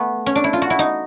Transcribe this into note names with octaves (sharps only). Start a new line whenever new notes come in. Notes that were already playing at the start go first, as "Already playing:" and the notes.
Already playing: A3 B3
C#4
D4
E4
F4
F#4
E4
D#4